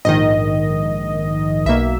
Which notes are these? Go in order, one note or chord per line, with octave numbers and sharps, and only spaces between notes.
A#1 G#2 D#3 D#5
B1 B2 A#3 E5